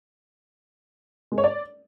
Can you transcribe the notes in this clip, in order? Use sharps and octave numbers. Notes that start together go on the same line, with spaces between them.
G#3
C#5
D5